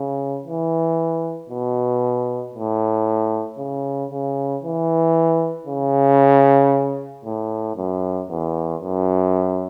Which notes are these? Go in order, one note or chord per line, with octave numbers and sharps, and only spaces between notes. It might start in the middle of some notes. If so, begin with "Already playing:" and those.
Already playing: C#3
E3
B2
A2
C#3
C#3
E3
C#3
A2
F#2
E2
F#2